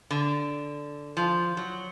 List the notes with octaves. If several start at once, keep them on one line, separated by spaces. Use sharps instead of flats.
D3
F3
F#3